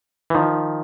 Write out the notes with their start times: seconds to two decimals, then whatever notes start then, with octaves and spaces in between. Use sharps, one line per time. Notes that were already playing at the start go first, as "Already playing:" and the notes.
0.30 E3
0.35 D#3 F3